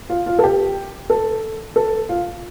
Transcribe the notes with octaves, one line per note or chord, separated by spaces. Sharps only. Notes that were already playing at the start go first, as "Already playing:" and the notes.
F4
F4
A4
G4
A4
A4
F4